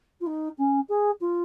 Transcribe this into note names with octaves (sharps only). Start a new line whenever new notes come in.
F4
D#4
C#4
G#4
F4